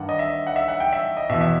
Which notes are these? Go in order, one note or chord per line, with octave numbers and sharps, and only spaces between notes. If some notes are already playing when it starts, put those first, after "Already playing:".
Already playing: G2 D#3 F#5
D#5
E5
F#5
E5
F#5
G5
E5
D#5
E2 B2 E5
E5